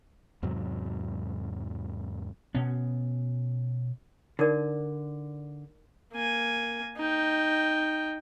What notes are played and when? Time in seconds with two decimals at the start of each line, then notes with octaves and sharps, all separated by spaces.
0.43 E2 G#2 C3 F#3
2.54 B2 B3 C#4
4.39 D3 D#4 A#4 D5
6.13 A#3 G#5
6.97 D#4 G5